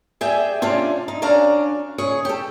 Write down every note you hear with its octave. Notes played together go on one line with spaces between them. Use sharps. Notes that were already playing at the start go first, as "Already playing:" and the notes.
G4 G#4 D5 E5 G5
C3 C#4 D4 F4
D#4
F#2 C#4 D4 D5 F5 A#5
C#3 G#4 C#5
G4 A4